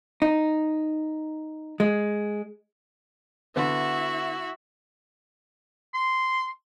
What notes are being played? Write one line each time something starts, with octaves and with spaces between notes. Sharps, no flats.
D#4
G#3
D3 B3 E4 F#4 E5
C6